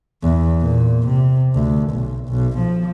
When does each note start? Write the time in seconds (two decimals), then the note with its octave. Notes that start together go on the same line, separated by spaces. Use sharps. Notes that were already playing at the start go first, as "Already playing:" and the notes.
0.23 E2
0.60 A#2
1.07 C3
1.54 D2
1.90 B1
2.29 B1
2.59 F3